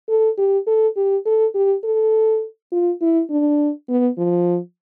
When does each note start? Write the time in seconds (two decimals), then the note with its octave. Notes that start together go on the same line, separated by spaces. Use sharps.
0.09 A4
0.38 G4
0.67 A4
0.96 G4
1.26 A4
1.55 G4
1.84 A4
2.72 F4
3.01 E4
3.30 D4
3.89 B3
4.18 F3